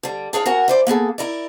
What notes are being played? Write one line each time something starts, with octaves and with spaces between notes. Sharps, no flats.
D3 G3
D4 G#4 C#5 F5
F#4 A#4 F#5 G#5
E4 C5 D5
A#3 B3 G#4 A4
E4 A#4 D5